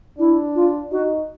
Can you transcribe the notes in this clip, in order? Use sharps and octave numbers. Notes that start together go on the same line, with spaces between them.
D4 E4
F4
D#4 F#4